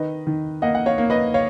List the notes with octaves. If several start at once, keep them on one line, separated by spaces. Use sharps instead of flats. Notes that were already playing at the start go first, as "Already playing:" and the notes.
Already playing: D#3 B4 D#5
D#3
A#3 D#5 F#5
F#5
C#5 F5
A#3
B4 D#5
C#5 F5